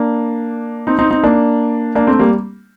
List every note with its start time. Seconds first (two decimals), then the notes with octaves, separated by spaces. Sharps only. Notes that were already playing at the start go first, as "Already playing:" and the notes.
Already playing: A#3 D4
0.87 C4 D#4
0.99 C4 D#4
1.11 C4 D#4
1.23 A#3 D4
1.95 A#3 D4
2.07 A3 C4
2.19 G3 A#3